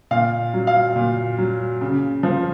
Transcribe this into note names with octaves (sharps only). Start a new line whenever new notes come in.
A#2 F5
F#3
F5
A#2
F#3
C#3
F3